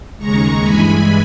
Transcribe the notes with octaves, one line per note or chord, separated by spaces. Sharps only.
D#2 C#3 G#3 A#5 C#6
G2 E3 G#3 G#5 B5